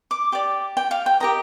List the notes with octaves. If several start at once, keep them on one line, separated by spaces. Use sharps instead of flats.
D6
G4 D5 D6
G5
F5
G5
G4 A#4 D#5 A#5